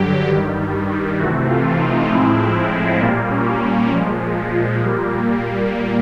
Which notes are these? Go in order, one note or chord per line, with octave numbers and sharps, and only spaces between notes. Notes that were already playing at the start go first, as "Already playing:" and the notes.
Already playing: G2 D3 F#3 G4
G2 D#3 G3
C3 E3 A3 C4 F#4
F4
D#4
A2 F3 G#3 C4 E4
E4
A#2 G3 A#3 F4
C#4
C#4
A#2 F3 G#3
A#2 G3 A#3